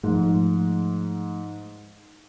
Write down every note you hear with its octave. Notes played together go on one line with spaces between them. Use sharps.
G#2 F3 A3